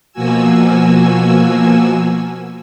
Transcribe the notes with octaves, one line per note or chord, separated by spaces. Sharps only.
B2 F3 A#3 F#4 G#5 E6